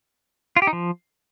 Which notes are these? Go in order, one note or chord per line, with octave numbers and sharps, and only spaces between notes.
F4
G4
D#4
F3